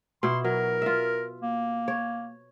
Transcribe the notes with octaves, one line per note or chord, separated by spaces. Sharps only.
B2 E4 C6
F#3 A#4
F4 E5
A#3
C#5